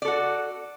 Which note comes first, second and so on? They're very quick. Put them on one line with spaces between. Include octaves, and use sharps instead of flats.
D5 A4 F#4